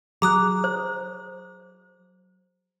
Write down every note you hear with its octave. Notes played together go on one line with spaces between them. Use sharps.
F#3 G#4 A#5 D#6 F#6
C5